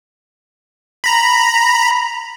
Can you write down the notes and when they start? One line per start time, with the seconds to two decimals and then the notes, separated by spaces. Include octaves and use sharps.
1.04 A#5 B5